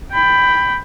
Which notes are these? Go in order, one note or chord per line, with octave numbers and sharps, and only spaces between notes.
G5 B5